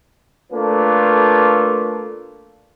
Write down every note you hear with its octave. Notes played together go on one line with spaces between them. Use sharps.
A3 A#3 D4 F4 A4 B4